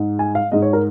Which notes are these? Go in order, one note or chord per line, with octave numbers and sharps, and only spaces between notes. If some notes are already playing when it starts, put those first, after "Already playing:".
Already playing: G#2 G#3
G#5
F5
G#2 G#3 D#5
C#5
A#4